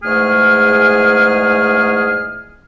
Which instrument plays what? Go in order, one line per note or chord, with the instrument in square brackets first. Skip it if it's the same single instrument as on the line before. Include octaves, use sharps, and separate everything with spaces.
[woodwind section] E2 G#2 A3 G#4 F6